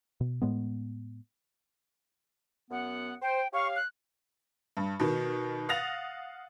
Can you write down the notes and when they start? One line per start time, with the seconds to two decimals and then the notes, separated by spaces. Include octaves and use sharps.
0.21 B2
0.42 A2 G#3 B3
2.71 F#2 B3 F#5
3.22 C5 G5
3.53 G4 C#5 F5 C#6
3.76 F#6
4.77 G2
5.00 B2 D#3
5.69 F5 F#5 D#6 A6 A#6 F7